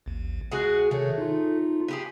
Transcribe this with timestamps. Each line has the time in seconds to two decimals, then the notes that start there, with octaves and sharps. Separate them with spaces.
0.06 A1 D#2
0.52 G#3 F#4 G#4 F#5 F#6
0.91 C3 D#3 A3 C#5
1.18 D#4 F4
1.88 B3 G4 G#4